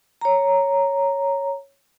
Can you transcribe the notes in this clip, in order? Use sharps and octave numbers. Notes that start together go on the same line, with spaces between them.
C#5 A#5